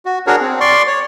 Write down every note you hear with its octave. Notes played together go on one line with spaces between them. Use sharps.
F#4
D4 F#4 G#4 A#4 C#5
C4
D5 C6 C#6
C#5